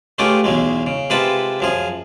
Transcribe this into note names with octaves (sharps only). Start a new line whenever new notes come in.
G#3 A3 C#4 F4 G4 B4
B1 E2 F#3 G#3
C#3
C3 G#3 F4 B4 A5 B5
F#2 F3 G#4